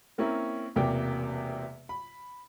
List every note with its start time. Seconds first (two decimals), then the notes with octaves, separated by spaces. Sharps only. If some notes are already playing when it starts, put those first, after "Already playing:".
0.18 A#3 C4 C#4 E4 A#4
0.76 E1 E2 C3 A#3 G5 D6
1.89 B5